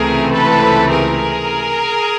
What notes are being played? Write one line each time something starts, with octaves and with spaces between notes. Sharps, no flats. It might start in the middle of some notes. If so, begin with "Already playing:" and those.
Already playing: C#2 C3 E3 A3 C4 G#4 A#4
A4 B4
G#4 A#4